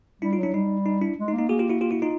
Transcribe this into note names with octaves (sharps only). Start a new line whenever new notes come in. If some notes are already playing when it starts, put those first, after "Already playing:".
G3 D4 E4
D#4 F4
F#3 D4 E4
G3 D#4
D#4
D4 E4
G#3
D#4
A#3
D#4
A#3 F#4 G#4
F4 G4
E4 F#4
F4 G4
E4 F#4
D#4 F4